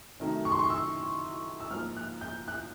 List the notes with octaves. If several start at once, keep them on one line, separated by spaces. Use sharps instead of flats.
C3 D#3 F#3 A3
C#6
C6
C#6
E6
E6
G#2 F3 A#3 F6
F#6
G6
F#6